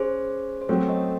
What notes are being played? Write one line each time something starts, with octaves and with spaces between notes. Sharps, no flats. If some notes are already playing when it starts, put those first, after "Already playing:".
Already playing: C#4 G#4 C5
C5
F#3 A3 C4 A4 C#5
C5 D#5